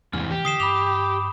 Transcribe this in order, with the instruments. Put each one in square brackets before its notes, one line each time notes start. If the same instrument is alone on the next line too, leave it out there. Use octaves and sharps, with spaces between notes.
[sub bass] E2 [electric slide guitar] G#2 C3 E3 [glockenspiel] F6
[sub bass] E3 [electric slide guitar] G4
[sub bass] D3 [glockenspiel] D#6 C7 E7
[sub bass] G2 [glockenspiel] B5 F7 [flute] D6